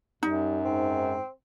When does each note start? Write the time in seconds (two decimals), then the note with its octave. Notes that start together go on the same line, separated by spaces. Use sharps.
0.23 F#2 G3 D#4
0.65 G#2 C4